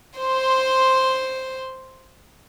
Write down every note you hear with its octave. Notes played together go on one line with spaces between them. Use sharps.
C5 C6